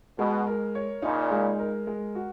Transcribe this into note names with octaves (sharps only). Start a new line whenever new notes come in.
B2 G#3
A#4
C#5
A#2 C#3 D#4
G#3
A#4
G#3
F#4